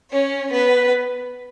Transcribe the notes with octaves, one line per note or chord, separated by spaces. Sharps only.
C#4 C#5
B3 B4